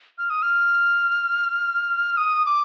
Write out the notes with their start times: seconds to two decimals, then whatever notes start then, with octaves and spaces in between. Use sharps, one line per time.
0.18 F6
0.30 D#6
0.42 F6
2.17 D#6
2.46 D6